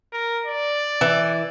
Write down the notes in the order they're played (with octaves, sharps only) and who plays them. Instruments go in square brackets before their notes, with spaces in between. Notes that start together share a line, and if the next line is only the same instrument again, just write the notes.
[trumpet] A#4
D5
[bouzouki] E3